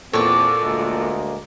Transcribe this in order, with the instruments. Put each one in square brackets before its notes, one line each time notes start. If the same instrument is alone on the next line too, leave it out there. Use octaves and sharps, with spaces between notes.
[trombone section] E2 B3 C4 [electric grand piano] A#2 A4 [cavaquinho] C#5 D5
[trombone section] D2 G#3 A#3